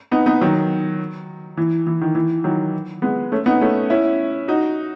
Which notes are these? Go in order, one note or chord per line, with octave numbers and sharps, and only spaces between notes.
B3 D#4
B3 D#4
D#3 F#3
E3
E3
D#3
E3
D#3 F#3
G#3 B3
A3 C#4
B3 D#4
A3 C#4
C#4 E4
D#4 F#4